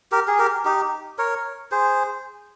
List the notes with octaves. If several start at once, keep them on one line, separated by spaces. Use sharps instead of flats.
G4 A#4
G#4
G4 A#4
D#4 G4
A#4 C#5
G#4 C5